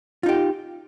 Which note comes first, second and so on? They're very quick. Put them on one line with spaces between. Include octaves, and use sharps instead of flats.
F4 D#4 G4